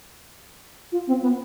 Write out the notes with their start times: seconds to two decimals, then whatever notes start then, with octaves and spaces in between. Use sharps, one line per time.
0.92 F4
1.07 C4
1.22 B3